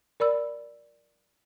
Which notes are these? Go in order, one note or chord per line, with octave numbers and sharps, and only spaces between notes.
A#4 D5 B5 E6